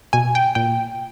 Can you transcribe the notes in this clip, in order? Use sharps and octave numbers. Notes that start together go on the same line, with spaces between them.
B2 G#5
G5
A#2 G5